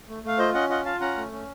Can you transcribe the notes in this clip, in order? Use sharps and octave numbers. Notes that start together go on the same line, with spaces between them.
A3
A3 F5
F4 C5 D#5
C#4 D#5 F#5
F4 D#5 F#5
F4 F5 A5
C#4 F#5 A#5
A3
C#4